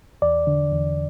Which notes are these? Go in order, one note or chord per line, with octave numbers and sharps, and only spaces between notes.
E2 D5
D3
E2